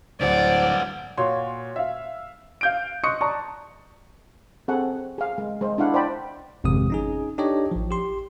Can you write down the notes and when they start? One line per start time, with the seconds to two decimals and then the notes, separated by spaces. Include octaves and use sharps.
0.20 D1 G2 C5 D5 F#5
1.18 A#2 F#4 C#5 C6
1.76 E5 F5
2.61 F5 G6 D7
3.03 D#5 C6 C#6 D#6 F#6 C#7
3.21 D5 A5 A#5 C#6
4.68 C4 G#4 A4 F#5
5.18 G#4 F5
5.38 G#3
5.61 G#3 C5
5.78 D4 E4 F5 F#5
5.94 C5 D5 G5 B5
6.64 G#1 F2 C3 G#3 D#6
6.90 C#4 D#4 G#4
7.38 D4 D#4 G4 A4 C#5 D#5
7.72 A1 F3
7.91 G4 C6